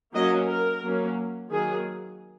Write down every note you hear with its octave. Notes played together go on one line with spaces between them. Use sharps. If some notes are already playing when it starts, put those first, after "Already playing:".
F#3 A#3 C#4 D#5
A#4
F#3 A#3 C#4
D#3 F#3 A#3 G#4